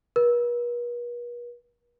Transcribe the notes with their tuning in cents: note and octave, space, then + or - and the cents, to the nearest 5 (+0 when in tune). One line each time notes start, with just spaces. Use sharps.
B4 -45